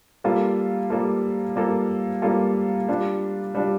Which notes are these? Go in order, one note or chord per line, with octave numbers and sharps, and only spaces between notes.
G3 A#3 F4 A4
G3 A#3 F4 A4
G3 A#3 F4 A4
G3 A#3 F4 A4
G3 D4 F4
G3 D4 F4